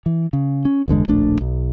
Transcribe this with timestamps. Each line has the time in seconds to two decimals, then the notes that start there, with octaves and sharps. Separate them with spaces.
0.06 E3
0.33 C#3
0.65 C#4
0.88 G1 E2 D3 G#3
1.08 D1 A#1 A3 D4
1.41 B1